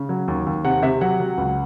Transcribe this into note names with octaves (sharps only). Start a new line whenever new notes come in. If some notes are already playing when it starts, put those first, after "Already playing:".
Already playing: C#3
F#3
D#2
D#2
C3 F#5
C3 E5
F#3 F#5
F#3
C#2